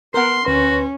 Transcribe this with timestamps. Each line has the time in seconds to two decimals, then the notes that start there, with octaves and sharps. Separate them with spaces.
0.14 B3 A#4 F#5 C6
0.45 D2 C#4 F#4 B4 C6